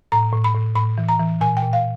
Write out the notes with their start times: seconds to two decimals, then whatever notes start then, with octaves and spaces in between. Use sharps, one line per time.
0.12 A2 A#5
0.33 A2
0.44 B5
0.54 A2
0.76 A2 B5
0.98 E3
1.09 A#5
1.20 E3
1.41 A#2 G#5
1.57 G5
1.62 A#2
1.73 F5